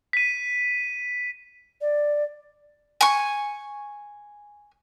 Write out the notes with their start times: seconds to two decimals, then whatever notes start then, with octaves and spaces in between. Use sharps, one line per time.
0.13 B6 D#7
1.81 D5
3.01 G#5 C#6